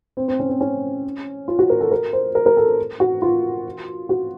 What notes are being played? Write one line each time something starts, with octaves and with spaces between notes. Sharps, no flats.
C4
C4
C#4
C4
C#4
F4
F#4
A#4
A4
A#4
C5
A#4
A#4
A4
F#4
F4
F#4